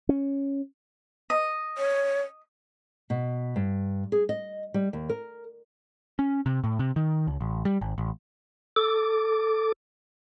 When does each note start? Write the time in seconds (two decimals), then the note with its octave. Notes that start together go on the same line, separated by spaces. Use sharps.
0.09 C#4
1.30 D#5
1.78 C#5
3.10 B2
3.56 G2
4.12 G#4
4.29 D#5
4.74 G3
4.93 D#2
5.09 A#4
6.19 C#4
6.46 C3
6.64 A2
6.79 C3
6.96 D#3
7.27 C#2
7.41 A1
7.65 G3
7.81 G#1
7.98 A1
8.76 A4 D6